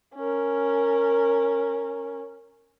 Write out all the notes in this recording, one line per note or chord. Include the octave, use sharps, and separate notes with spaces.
C#4 A#4